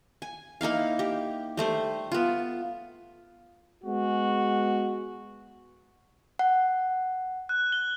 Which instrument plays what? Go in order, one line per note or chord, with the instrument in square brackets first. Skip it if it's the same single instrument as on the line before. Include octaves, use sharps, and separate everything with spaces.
[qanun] G#5
A#3 D#4 E4 F5
G4
G3 A3 C5
B3 F4
[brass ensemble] G#3 B3 F#4
[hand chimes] F#5
[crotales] F#6
G7